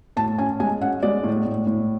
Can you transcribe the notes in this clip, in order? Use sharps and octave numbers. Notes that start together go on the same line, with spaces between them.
A2 A5
C#4 G#5
G#3 G#5
C#4 F#5
G#3 D5
A2
A2
A2